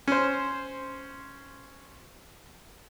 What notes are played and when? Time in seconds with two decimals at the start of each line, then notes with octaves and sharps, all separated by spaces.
0.08 C#4 C5